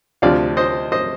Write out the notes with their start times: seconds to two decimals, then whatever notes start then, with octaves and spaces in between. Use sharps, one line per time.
0.22 D2 C3 F3 D5 F5
0.57 C5 D#5
0.92 C5 D#5